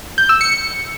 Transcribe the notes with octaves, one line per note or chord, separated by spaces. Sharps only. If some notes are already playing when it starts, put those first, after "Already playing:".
G6
E6
C#7